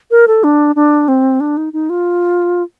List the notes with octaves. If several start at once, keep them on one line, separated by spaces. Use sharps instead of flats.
A#4
A4
D4
D4
C4
D4
D#4
D#4
F4